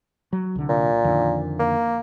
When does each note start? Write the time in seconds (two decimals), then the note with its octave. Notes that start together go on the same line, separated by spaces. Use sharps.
0.33 F#3
0.56 C2 D3
0.69 A#2
1.04 F2 D3 D#3
1.59 A#3